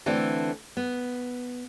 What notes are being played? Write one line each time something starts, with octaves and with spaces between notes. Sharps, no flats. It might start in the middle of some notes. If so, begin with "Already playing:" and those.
D3 E3 A3 C4 D4 E4
B3